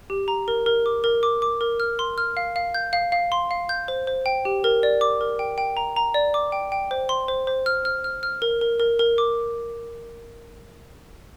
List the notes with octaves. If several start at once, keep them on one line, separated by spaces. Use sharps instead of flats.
G4
A#5
A#4
A#4
D6
A#4
D6
D6
A#4
F6
C6
F6
F5
F5
G6
F5
F5
C6
F5
G6
C5
C5
G5
G4
A#4
D5
D6
A#4
G5
G5
A#5
A#5
D5
D6
G5
G5
C5
C6
C5
C5
F6
F6
F6
F6
A#4
A#4
A#4
A#4
D6